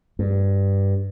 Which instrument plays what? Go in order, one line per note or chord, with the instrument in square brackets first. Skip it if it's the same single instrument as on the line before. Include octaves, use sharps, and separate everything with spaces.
[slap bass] G2